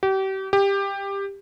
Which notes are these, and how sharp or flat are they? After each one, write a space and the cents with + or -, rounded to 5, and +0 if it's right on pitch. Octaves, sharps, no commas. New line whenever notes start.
G4 -35
G4 +15